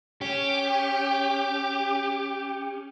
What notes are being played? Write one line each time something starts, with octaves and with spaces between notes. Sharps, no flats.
C#4 G4